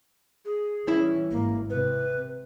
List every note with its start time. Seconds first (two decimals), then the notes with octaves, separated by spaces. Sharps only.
0.45 G#4
0.88 E3 G3 C#4 E4
1.31 G#1 A#3
1.70 C3 B4